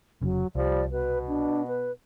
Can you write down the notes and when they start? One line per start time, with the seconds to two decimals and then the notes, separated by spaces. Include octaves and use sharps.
0.21 F1 C#3 F#3
0.55 C2 F3 G3 D5
0.92 B2 B4
1.28 D4
1.67 B4